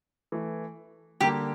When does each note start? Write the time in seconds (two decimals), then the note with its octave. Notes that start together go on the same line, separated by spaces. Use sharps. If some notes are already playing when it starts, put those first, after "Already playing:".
0.32 E3 A3 E4
1.21 D3 G3 A#3 G4